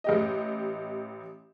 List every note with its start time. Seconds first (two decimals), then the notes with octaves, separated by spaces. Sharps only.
0.04 A1 G4 D#5